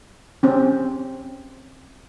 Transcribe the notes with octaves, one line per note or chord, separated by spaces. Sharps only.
C4 C#4